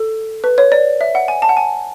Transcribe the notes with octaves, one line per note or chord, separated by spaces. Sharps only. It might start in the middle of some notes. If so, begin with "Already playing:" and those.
Already playing: A4
B4
C#5
D5
E5
F#5
G#5
A5
F#5
G#5